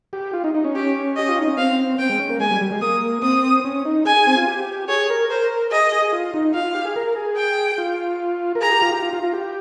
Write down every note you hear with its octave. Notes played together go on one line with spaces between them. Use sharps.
G4
F4
D#4
D#4
C#4
G4
G4 D#5
F4
D#4
C#4
C4 F5
C4 G5
G#3
C#4
A#3
G#3 G#5
G3
G3
G#3
A#3 D#6
C4 D#6
C#4
D#4
G#4 G#5
G#4
C4
F4
G4
G#4 C#5
A#4
A#4 C5
G#4 D#5
G#4
G#4
F4
D#4
F4 F5
F4
G4
G#4
A#4
G#4
G5
F4
A#4
G#4 A#5
G4
F4
G4
F4
F4
F4
G4